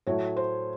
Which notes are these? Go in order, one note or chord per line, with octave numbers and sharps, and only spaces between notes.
A2 F#3 A3 C#5
C5